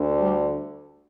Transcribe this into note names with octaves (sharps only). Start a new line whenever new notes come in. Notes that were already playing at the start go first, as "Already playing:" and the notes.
Already playing: D2 D3
G3